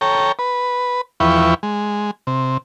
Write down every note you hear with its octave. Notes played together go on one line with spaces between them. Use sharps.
A4 C#5 G5 A#5
B4
E2 F3 E4 B4 G5 C#6
G#3
C3